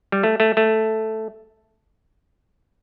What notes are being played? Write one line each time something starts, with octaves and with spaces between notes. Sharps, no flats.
G3
A3
A3
A3